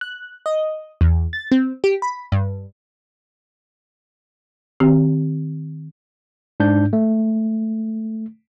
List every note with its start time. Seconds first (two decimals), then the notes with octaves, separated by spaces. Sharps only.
0.01 F#6
0.46 D#5
1.01 E2
1.33 A6
1.51 C4
1.84 G4
2.02 B5
2.32 G2
4.80 D#3 C4 G4
6.60 G#2 D4 G6
6.93 A3